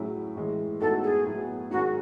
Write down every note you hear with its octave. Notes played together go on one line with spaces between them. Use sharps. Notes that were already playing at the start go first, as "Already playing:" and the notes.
Already playing: A2 F#3 C#4 E4 G#4
A2 E3 G#3
A2 G#3 B3 D#4 F#4 A4
G#4
A2 F#3 B3
G#2 D#3 F#3 C#4 F#4 G#4